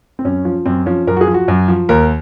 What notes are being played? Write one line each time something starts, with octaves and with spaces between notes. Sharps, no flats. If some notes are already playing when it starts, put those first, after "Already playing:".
C4
F#2 C#4
F3
F#2 C4
F3 C#4
F#2 A#4
F#4
G#4
F3
F#4
F#2
F3
D#2 A#4